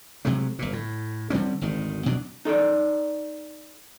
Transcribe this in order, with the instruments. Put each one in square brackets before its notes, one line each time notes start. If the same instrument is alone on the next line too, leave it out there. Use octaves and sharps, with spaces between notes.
[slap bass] C3 F#3 G#3 A3
G1 A#2
A2
D3 G3 C4 C#4
G#1 D2 D#3
B2 F#3 D4
[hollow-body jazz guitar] D#4 A4 C#5 D5